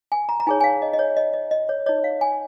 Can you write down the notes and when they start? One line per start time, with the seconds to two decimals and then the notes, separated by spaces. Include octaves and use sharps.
0.12 G#5
0.29 A#5
0.40 A#5
0.47 D#4 G#4 C#5 G#5
0.61 G#5
0.64 F5
0.82 D#5
0.93 D#5
0.99 C#5
1.17 D#5
1.34 D#5
1.51 D#5
1.69 C#5
1.86 D#4 C#5 D#5
2.04 F5
2.21 G#5